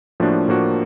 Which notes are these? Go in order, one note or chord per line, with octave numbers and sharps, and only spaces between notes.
A2 F3 A#3 D4 F#4
A2 F3 A#3 D4 F#4